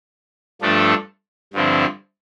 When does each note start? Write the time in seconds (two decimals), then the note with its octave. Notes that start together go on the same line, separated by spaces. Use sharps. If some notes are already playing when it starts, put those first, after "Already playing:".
0.61 G2 F3 A3 D4 A4
1.53 G2 D3 F3 C4 E4